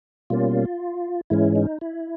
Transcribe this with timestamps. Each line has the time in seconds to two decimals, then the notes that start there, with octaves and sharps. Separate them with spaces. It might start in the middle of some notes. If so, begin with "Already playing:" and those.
0.30 B2 G3 A#3 C#4 F4
1.30 G#2 E3 G#3 C#4 E4
1.56 D#4
1.81 E4